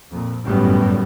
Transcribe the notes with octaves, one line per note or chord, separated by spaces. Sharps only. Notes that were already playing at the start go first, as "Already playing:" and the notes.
F2 A#2
G1 F#2 A2 G3 B3